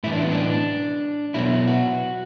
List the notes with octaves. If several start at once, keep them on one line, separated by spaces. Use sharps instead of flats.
A2 E3 E4
D4
B3
D4
B2 F#3 E4
F#4